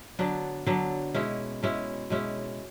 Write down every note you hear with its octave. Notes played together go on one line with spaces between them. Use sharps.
D3 F#3 B3 D4
D3 F#3 B3 D4
B2 G#3 C#4 E4
B2 G#3 C#4 E4
B2 G#3 C#4 E4